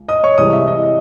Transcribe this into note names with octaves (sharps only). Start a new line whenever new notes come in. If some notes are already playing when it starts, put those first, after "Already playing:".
Already playing: C#2
D#5 D#6
C#5 C#6
C2 C3 E3 G#3 D#5 D#6
E5
D#5
D#5